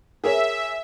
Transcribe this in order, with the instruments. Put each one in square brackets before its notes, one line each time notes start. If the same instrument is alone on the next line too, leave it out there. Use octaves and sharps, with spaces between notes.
[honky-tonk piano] G#4 A#4 C#5 [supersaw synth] E5